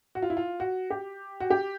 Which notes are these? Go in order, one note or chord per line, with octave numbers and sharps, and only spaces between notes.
F#4
F4
E4
F4
F#4
G4
F#4
G4